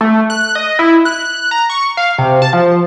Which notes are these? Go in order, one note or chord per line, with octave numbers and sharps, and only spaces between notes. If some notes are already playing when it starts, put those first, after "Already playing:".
A3
F#6
D#5
E4
F#6
A#5
C#6
F5
C3
A5
F3